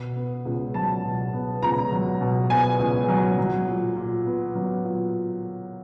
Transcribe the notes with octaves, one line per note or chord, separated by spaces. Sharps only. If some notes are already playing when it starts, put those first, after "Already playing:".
Already playing: B2
B3
C#2
F#3 A5
B2
B3
C#2 A#5
F#3
B2
B3 G#5
C#2
F#3
F#3
A#2
A#2
B3
F#3
A#2